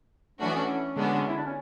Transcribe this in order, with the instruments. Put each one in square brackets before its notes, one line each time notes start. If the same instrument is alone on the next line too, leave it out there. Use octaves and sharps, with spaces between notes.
[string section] E3 A3 D4 F#4 [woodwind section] C#4
[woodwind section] B3
C#4
[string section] D3 G#3 B3 D4 F#4
[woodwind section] E4
D4
C#4